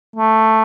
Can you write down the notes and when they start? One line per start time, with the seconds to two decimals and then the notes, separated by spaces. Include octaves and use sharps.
0.16 A3